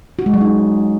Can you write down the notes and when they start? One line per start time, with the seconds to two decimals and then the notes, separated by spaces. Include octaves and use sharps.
0.19 F#4
0.26 G#3
0.34 F#3
0.41 D#4